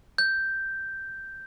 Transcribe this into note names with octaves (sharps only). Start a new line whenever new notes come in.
G6